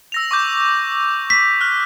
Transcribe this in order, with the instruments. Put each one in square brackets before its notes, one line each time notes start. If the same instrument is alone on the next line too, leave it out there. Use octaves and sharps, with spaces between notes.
[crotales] E6 A#6 F7
C#6 D6 G6
[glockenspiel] B6
[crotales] F6 F#6